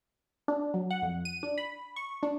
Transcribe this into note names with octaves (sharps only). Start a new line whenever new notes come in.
D4
F#3
F#5
F2
D#7
D4
B5
C#6
D4